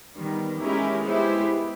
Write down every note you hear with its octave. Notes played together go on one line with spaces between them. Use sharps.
D#3 G3 B3
G#3 C#4 E4 G4 A#4
G#3 B3 E4 G4 C5